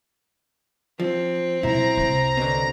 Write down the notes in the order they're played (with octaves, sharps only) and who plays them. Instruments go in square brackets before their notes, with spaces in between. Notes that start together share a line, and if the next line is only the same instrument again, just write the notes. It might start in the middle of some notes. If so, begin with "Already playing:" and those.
[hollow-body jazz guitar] F3 [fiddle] C4
[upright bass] B2 F#3 [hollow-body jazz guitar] E4 [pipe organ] A#5
[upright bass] C2 F4
[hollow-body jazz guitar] B2 D3